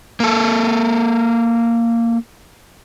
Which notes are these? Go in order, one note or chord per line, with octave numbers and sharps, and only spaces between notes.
A#3 A4